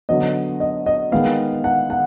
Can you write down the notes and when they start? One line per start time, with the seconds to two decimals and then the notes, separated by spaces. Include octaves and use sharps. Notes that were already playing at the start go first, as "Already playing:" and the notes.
0.09 D3 F#3 B3 D#5
0.60 D#5
0.86 D#5
1.12 D#3 G#3 B3 F5
1.64 F#5
1.90 F#5